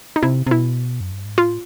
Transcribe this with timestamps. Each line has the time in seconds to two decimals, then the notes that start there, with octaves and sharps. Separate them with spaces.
0.16 D#4
0.23 C3 E4
0.47 C3
0.51 B2 E4
1.01 F#2
1.12 G2
1.25 G#2
1.38 A2 F4